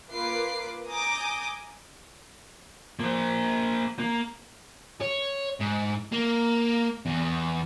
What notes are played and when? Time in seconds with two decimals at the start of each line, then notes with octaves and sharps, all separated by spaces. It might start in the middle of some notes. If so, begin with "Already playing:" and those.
0.13 A#3 F4 B4 D6 C7
0.89 G#5 A#5 D6 D#6 G6
3.00 A#3 C5
3.99 A#3
5.01 C#5
5.60 G#2
6.12 A#3
7.06 E2